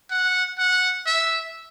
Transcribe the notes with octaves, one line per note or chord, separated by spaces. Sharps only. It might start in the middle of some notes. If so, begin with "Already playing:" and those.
F#5
F#5
E5